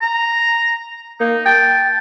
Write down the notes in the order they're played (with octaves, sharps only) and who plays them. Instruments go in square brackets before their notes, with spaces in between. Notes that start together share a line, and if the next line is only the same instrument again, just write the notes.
[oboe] A#5
[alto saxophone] A#3 [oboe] D#4
[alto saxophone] G5 [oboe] A5